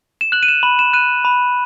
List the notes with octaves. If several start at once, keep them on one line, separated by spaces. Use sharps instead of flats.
E7
F#6 F#7
D#7
E7
B5 F#7
E7
F#6 D#7
B5